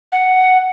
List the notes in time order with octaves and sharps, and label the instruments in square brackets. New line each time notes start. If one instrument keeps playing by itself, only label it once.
[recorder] F#5